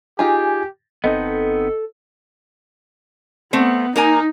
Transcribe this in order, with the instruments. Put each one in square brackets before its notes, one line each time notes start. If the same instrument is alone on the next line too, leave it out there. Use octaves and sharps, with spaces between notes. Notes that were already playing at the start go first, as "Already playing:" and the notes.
[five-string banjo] D#4 F4 G#4 [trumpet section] G4 [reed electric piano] G#5
[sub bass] G1 [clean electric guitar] B3 C4 D#4 [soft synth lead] A4 [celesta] D#5
[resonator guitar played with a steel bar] A3 C4 [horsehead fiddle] B3
[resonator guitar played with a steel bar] A#3 A#4 G#5 [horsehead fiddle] D#4